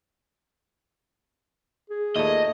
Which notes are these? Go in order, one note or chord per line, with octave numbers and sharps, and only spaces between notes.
G#4
D#2 A#2 A3 D#5